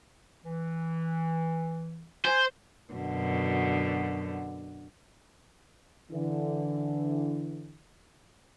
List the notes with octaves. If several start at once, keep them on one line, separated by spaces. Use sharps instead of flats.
E3
C5 G#5
F#2 B2 D3
D3 E3